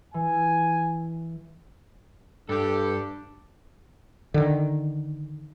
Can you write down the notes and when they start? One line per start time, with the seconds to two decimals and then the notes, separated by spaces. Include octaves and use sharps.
0.14 E3 G#5
2.49 G2 D4 G4 A4
4.34 D3 D#3